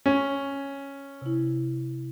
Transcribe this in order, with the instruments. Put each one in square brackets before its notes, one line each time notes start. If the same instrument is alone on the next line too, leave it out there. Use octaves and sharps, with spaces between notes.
[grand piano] C#4
[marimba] C3 E4